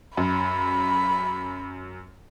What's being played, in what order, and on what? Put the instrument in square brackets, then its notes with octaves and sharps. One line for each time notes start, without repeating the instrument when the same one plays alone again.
[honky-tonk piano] F#2 [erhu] B5